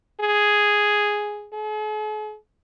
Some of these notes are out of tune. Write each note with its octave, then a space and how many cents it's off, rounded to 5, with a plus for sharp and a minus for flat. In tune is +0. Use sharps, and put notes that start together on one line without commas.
G#4 +0
G#4 +45